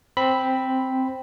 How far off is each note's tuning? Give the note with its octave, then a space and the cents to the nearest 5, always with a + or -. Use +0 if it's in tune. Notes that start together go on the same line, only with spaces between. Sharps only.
C4 +0 B5 +0